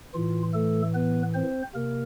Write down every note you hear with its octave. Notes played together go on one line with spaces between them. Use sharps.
A2 E3 F4
A3 A4
B3 B4
C4 C5
C3 A#3 A#4